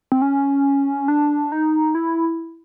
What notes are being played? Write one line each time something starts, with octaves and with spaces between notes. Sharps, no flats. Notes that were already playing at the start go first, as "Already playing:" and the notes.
C4
C#4
D4
D#4
E4